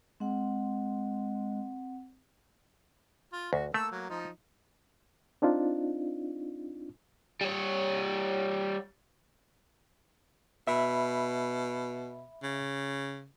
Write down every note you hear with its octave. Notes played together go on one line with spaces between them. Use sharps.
G#3 C4 F#5
F4
D2 F#4
A3 A#3 A4 E6
F#3 A#3
F3 D#4
C4 D4 D#4 F4
G3 C#5
B2 E5 B5
C#3